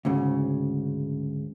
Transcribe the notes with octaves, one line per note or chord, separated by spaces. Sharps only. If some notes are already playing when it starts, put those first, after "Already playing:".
D2 G#2 C#3